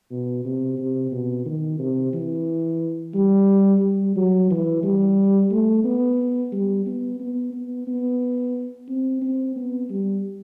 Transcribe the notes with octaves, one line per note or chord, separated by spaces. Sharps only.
B2
C3
C3
B2
D#3
C3
E3
G3
G3
F#3
E3
G3
A3
B3
G3
B3
B3
B3
B3
C4
C4
B3
G3